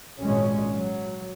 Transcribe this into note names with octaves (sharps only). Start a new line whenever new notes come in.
G#1 A#2 G#3 C#4
F#3